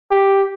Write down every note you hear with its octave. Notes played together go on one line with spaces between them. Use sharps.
G4